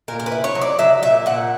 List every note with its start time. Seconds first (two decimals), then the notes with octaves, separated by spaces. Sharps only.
0.08 A#2 A#4
0.20 A#4
0.26 B4
0.32 E4
0.44 C#5
0.55 F#3
0.62 D5
0.79 F#3 E5
1.03 A#2 E5
1.26 A#2 F#5